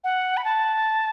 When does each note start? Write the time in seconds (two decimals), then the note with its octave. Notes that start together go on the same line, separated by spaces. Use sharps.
0.04 F#5
0.37 B5
0.45 A5